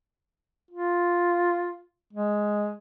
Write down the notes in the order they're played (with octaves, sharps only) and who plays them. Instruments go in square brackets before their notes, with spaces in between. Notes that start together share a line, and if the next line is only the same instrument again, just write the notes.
[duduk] F4
G#3